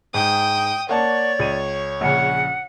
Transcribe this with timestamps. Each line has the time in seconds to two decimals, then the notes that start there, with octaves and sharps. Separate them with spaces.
0.14 G#2 G5 D#6
0.89 A#3 C#5 D5 F#5 A5
1.39 C#2 D#7
2.01 A#1 C#3 F#5